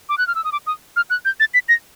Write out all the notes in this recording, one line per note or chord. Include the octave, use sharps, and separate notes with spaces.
D6
F#6
F6
E6
D#6
D6
D#6
F6
F#6
G6
A6
B6
A#6